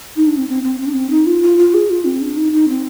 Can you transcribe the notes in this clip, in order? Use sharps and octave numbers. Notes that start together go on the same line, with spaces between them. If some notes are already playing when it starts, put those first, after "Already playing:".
D#4
D4
C4
C4
C4
C4
D4
C4
D#4
F4
F4
F4
G#4
F4
C4
D4
D#4
D#4
C4